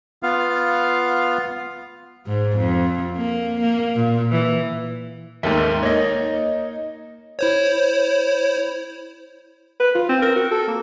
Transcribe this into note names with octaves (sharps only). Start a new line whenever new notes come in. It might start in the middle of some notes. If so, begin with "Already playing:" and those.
B3 F4 F5
G#2
F2
A#3
A#3
A#2
E3
D#2 G#2 A4 A#4 E5
A#3 D#4 C#5 D#5
E4 C5 C#5
B4
F4
C4
A#4
F#4
A4
A#3